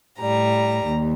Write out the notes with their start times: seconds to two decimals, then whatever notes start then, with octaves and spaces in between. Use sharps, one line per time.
0.20 A2 G3 A#5
0.85 D#2